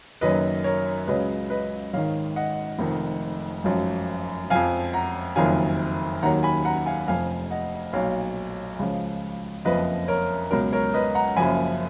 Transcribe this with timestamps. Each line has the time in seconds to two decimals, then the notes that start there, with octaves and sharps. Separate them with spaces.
0.21 F#1 F#2 D#3 F#3 B4 D#5
0.64 A#4 C#5
1.08 C#2 C#3 F#3 B4 D#5
1.50 B4 D#5
1.93 G#1 G#2 D#3 C#5 F5
2.36 D#5 F#5
2.79 F1 F2 D#3
3.64 G#1 F#2 F3
4.50 F2 F3 F5 G#5
4.93 F#5 A#5
5.36 F#1 F2 D#3 F#3 F5 G#5
6.22 D#2 D#3 F#3 F#5 A#5
6.43 G#5 B5
6.65 F#5 A#5
6.86 F5 G#5
7.08 F1 F2 F3 F5 G#5
7.50 D#5 F#5
7.93 B1 A#2 F#3 C#5 F5
8.79 C#2 C#3 F3
9.65 F#1 F2 F3 B4 D#5
10.08 A#4 C#5
10.51 C#2 B2 F#3 A#4
10.72 A#4 C#5
10.94 B4 D#5
11.15 F#5 A#5
11.36 F#1 F#2 F3 G#5 B5